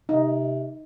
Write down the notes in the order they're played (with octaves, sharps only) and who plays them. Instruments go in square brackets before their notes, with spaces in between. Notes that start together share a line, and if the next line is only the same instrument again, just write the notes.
[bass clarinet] C3 [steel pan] D#4